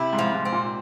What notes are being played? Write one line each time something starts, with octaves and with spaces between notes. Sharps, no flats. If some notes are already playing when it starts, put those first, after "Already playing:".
Already playing: C3 E4
G#2
F3
G#2
C4
A#2